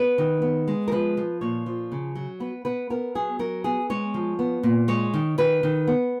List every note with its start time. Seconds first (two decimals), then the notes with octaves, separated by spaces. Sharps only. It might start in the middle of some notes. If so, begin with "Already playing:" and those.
Already playing: B3 B4
0.18 D#3
0.42 B3
0.68 G#3
0.88 A#4
0.92 F3 B4
1.17 F3
1.41 A#2 C#5
1.66 F3
1.92 C#3
2.15 F#3
2.40 B3 B4
2.65 B3 B4
2.90 B3 A#4
3.15 F#3 G#4
3.39 F#3 A#4
3.64 B3 G#4
3.90 G#3 C#5
4.14 F3
4.39 B3
4.63 A#2
4.88 G#3 C#5
5.14 D#3
5.38 D#3 B4
5.63 D#3
5.87 B3